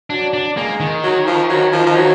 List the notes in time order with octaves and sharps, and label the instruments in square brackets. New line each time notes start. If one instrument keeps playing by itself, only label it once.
[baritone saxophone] F#3 [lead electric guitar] D4
[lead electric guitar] D4
[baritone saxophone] G#3 [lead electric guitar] A#3
[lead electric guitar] D#3
[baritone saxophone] F#3
F3
F#3
F3
F3
F#3